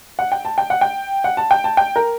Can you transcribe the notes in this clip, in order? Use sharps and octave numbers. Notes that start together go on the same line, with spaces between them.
F#5
G5
A5
G5
F#5
G5
F#5
A5
G5
A5
G5
A#4